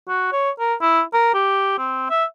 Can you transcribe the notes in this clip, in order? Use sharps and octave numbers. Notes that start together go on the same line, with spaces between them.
F#4
C#5
A#4
E4
A#4
G4
C4
E5